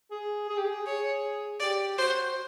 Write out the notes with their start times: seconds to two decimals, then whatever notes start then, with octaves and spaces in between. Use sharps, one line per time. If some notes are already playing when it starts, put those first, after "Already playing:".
0.11 G#4
0.49 G#4
0.57 G4
0.65 G#4
0.86 G#4 C#5
1.60 G4 D5
1.98 F#4 C5